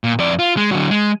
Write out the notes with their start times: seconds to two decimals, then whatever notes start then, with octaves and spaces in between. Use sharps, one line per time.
0.04 A#2
0.19 F2 D5
0.39 F4
0.57 G#3
0.71 D3 F#3
0.91 G#3